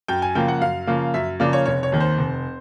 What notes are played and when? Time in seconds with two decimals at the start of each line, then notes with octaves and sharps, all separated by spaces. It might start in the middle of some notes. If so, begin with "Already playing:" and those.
0.08 F#2 G5
0.22 G#5
0.35 C#3 F3 A#3 G5
0.48 F#5
0.61 F#2 F5
0.87 C#3 F3 A#3
1.14 F#2 E5
1.40 C#3 F3 A#3 D5
1.53 C#5
1.66 F1 C#5
1.83 C#5
1.92 D#2 D#3
2.00 C5
2.18 F1